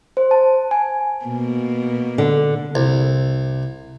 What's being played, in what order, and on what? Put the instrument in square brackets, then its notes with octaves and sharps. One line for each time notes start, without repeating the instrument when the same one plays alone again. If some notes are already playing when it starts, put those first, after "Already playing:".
[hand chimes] C5
A5
G#5
[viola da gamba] B2 A#3
[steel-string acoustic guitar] D3
[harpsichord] C2